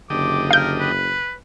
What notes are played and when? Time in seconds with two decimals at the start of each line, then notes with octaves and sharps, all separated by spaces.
0.10 F#1 D3 G4 D#5 D6
0.51 A#4 F5 G6
0.80 B4